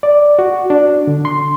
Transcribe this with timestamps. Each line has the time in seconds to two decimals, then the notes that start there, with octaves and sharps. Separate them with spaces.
0.03 D5
0.39 F#4
0.70 D4
1.07 D3
1.25 C6